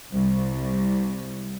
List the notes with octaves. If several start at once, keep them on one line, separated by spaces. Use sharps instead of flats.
C2